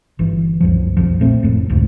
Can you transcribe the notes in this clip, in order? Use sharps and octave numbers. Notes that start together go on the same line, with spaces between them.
G1 E3
C2 F#2 F3
B1 F2 F3
A#2 A3 C4
F1 A2
F#1 D2 G#2 C3